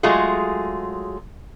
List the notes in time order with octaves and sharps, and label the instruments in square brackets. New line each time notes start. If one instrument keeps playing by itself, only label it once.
[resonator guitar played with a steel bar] F#3 G#3 A3 F4 G#4